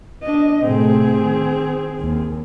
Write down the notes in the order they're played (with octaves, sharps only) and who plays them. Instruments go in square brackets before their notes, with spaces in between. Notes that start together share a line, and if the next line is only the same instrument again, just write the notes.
[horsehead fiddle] D4 D#5
[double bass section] A2 C3 A3 [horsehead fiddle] C4 G#4
[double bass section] D#3
D#2 D#3